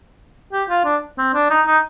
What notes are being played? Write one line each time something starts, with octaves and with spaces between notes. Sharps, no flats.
G4
F4
D4
C4
D4
D#4
D#4